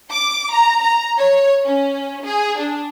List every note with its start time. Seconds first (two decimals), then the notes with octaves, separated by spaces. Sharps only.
0.12 D6
0.52 A#5
0.81 A#5
1.18 C#5
1.64 C#4
2.24 G#4
2.58 D4